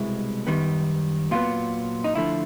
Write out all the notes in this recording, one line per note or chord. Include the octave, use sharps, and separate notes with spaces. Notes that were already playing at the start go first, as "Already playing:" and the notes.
Already playing: C2 B2 G#3 B3 E4
F#2 D#3 G3 B3
A#2 F#3 B3 F4
D#4
D2 D3 F3 A3 E4